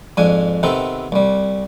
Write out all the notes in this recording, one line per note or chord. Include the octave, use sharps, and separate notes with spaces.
F2 G#2 D4 G#5
C3 D#3 B3 C4 A4
C2 G3